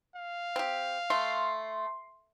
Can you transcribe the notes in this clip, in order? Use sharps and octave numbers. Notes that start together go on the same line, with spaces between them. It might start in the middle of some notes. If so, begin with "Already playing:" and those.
F5
C4 G4
A3 C6